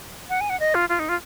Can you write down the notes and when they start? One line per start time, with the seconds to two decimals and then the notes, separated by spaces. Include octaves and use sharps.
0.29 F#5
0.41 G#5
0.50 F#5
0.60 D#5
0.75 F4
0.89 F4
0.99 D#4
1.09 F4